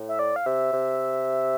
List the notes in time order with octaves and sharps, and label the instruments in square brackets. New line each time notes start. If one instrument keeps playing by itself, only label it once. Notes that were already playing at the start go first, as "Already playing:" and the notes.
Already playing: [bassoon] A2
[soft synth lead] E5
D5
F5
[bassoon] C3 [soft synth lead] E5
[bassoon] C3